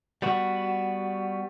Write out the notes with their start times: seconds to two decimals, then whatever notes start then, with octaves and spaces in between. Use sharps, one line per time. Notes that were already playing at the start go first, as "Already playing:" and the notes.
0.22 G3 B3 F#4